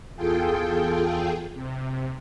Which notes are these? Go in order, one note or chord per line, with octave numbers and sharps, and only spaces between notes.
E2 F4 G#4 A4 G5
C3